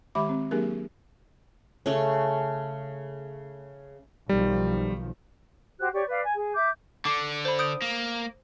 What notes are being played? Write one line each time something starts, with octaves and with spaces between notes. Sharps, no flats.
D#3 G#3 G4 E5 B5 D6
C4
F#3 A#3 D4 G4 G#4 A#4
C#3 A3 C#4
B1 D#3 F3 G3
F#4 G4 C5 F#6
G4 C#5 D5 C#6
B4 D5 F5
G#5
G#4
E5 D6 G6
D3 D6 C7
C5 B5
D#6 G6 D7
A#3